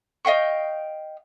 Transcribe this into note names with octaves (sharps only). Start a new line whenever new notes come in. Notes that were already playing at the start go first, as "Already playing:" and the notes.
D#5 F5 G5 C#6